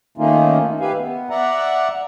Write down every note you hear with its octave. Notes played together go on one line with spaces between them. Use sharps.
D#3 A3 A#3 C#4 D#4 F4
G4 B4 E5 F5 G#5
B3
D5 E5 F#5 A#5